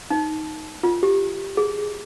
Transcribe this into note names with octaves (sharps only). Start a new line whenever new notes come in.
D#4
F4
G4
G#4